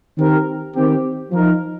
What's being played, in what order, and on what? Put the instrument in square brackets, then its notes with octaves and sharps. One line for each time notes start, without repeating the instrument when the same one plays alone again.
[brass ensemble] D#3 C4 G4 A#4
D#3 C4 G4
F3 D#4 A#4